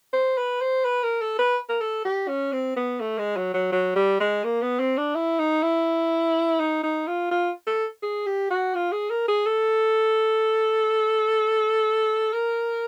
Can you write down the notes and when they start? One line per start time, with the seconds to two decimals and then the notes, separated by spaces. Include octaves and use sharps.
0.13 C5
0.37 B4
0.61 C5
0.85 B4
1.03 A#4
1.21 A4
1.39 B4
1.69 A#4
1.81 A4
2.05 G4
2.28 C#4
2.52 C4
2.76 B3
3.00 A3
3.18 G#3
3.37 F#3
3.54 F#3
3.72 F#3
3.96 G3
4.20 G#3
4.44 A#3
4.62 B3
4.80 C4
4.97 D4
5.15 E4
5.39 D#4
5.63 E4
6.59 D#4
6.83 D#4
7.07 F4
7.31 F4
7.67 A4
8.02 G#4
8.26 G4
8.50 F#4
8.75 F4
8.92 G#4
9.10 A#4
9.28 G#4
9.46 A4
12.33 A#4